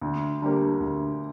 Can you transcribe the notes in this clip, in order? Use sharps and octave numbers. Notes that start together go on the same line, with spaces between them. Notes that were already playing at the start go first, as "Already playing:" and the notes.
D2
D3 G3 A#3
D2